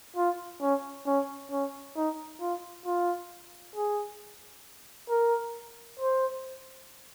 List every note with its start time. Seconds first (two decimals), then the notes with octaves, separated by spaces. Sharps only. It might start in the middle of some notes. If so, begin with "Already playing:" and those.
0.16 F4
0.61 C#4
1.06 C#4
1.51 C#4
1.97 D#4
2.41 F4
2.86 F4
3.76 G#4
5.09 A#4
6.00 C5